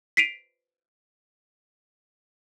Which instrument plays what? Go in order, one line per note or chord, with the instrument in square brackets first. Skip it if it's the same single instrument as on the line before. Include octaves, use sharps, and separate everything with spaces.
[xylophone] B6 C7 D7 D#7 F7